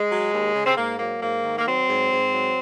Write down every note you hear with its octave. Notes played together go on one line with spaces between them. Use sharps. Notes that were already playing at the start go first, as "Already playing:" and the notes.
Already playing: G#3
F#3
D#2
C#3
C4
G#2 A#3
F#3 A#3
G#2 A#3
D#3
A#3
F#3 C4
G#2
G#2
F#3